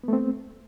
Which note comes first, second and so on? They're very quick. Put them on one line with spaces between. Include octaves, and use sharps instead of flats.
B3 A3 C4